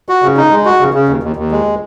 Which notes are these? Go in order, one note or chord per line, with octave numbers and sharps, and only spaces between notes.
F#4
C#3
D#4
G#3
F#4
C#3
C#3
D#2
D#2
D#2
G#3